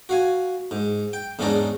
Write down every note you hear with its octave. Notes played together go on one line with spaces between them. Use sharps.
F#4 F5 G#5
G#2
G5
E2 G#2 C#4 D4 D5 A#5